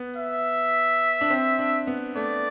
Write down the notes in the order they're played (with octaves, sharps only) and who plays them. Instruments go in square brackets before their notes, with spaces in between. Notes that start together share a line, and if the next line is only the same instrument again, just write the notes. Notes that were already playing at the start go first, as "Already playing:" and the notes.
Already playing: [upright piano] B3
[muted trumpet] E5
[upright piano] D4
C4
D4
B3
[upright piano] A3 [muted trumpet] D5